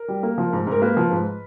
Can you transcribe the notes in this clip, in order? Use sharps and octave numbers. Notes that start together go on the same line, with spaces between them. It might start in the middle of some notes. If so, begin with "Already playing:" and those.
Already playing: A#4
G3
A#3
F3
G#2
G#2 A#4
A#3 B4
F3
G#2